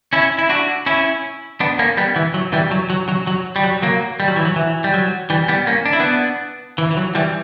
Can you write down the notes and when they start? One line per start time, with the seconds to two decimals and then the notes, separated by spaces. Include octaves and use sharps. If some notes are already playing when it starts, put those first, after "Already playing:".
0.13 C#4 E4
0.39 E4
0.49 D4 F#4
0.86 C#4 E4
1.60 B3 D4
1.79 A#3 C#4
1.97 G3 B3
2.16 E3
2.34 F#3
2.53 E3 G3
2.71 F#3
2.90 F#3
3.09 F#3
3.27 F#3
3.56 G3
3.64 F#3
3.82 F#3 A#3
4.20 G3
4.28 F#3
4.36 E3
4.45 F#3
4.56 E3
4.84 G3
4.94 F#3
5.30 E3 G3
5.48 G3 B3
5.67 A#3 C#4
5.86 D4
5.93 E4
6.00 B3 D4
6.78 E3
6.91 E3
6.97 F#3
7.15 E3 G3